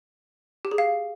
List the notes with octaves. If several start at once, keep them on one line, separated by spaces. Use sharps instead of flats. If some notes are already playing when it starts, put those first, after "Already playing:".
G4
G#4
F5